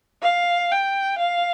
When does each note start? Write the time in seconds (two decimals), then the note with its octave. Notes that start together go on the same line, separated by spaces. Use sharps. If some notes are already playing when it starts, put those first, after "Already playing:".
0.23 F5
0.72 G5
1.19 F5